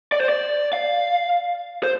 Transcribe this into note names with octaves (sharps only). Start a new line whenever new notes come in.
D5
C5
D5
F5
C5